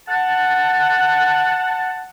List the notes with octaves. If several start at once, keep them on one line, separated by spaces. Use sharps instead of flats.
F#5 A5